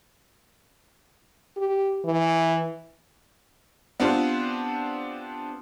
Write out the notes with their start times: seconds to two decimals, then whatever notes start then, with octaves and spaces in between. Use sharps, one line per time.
1.57 G4
2.05 E3
4.00 B3 C4 D4 F4 G4 C5